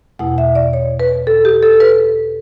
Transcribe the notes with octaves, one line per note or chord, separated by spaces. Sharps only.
E2 B2 A3 E4 F#5
E5
D5
C#5
B4
A4
G4
A4
B4